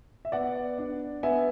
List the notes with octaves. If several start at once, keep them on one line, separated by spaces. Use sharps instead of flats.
E5
B3 D5 F#5
D4
B3 E5 G#5